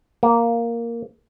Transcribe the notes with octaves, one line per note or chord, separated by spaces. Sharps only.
A#3